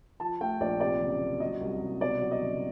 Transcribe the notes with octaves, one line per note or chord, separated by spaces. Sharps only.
F3 A5
A3 G5
A#1 D5
C3 D5
F#1
F#1
F#3 D#5
C2
C2
B2 D5
F#3
D#5
F#1